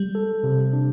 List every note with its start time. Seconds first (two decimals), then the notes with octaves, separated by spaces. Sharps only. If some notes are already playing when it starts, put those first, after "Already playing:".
Already playing: G3
0.15 A4
0.43 C3
0.73 D4